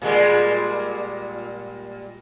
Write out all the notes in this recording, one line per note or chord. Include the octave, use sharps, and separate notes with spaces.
A#2 G3 G#3